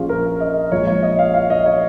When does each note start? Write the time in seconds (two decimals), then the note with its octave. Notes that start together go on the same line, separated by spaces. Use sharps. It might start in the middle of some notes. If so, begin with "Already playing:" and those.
Already playing: A#1 A#2 F3 C#4 F4 G#4
0.09 A#4
0.40 D#5
0.72 A#1 A#2 G#3 C#5
0.87 C#5
1.03 D#5
1.19 F5
1.34 F5
1.50 D#5
1.66 C#5